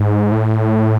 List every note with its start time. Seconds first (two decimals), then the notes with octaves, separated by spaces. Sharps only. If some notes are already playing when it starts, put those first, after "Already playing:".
Already playing: G#2
0.32 A2